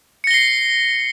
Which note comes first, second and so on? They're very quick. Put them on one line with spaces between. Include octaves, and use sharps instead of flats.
C#7 A#6 G7 C7